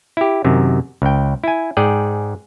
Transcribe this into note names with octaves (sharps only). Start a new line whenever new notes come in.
E4 G4
F#2 C3 D#3
C#2 G5
E4 G#5
G#2 G#4 D5 G5